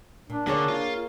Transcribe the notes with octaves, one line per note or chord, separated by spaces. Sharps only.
A#2 D4
D3 A#3 G#4 C#5
F4